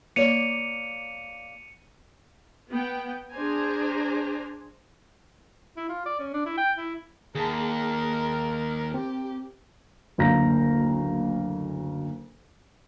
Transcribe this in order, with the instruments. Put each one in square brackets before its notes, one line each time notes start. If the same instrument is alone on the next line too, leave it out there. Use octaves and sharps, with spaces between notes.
[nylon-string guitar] A#3 C#5 D5 [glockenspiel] C#7 D#7 F7
[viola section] B3 G5
D4 G#4 C5 G#5 A#5
[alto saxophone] E4
F4
D5
C#4
D4
E4
G5
E4
[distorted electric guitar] D#2 [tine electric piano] G#4 A5 [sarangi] A#4
[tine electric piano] C4 [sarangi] G4
[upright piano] F#1 D2 A#3 F5 A#5 A#6